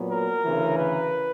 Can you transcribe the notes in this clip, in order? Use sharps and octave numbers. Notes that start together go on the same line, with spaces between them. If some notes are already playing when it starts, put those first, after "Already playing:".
Already playing: A#2 F#3 B3
A#4
D2 C#3 E3
B4